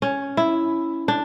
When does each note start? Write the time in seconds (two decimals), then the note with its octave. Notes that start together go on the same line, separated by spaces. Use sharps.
0.02 C#4
0.37 E4
1.08 D4